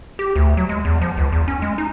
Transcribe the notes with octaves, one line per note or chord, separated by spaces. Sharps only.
G4
D2
F#3
G#3
E2
F3
C#2
E2
C#4
G#3
D#4